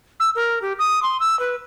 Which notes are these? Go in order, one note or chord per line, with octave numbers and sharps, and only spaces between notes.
E6
A#4
G4
D#6
C6
E6
B4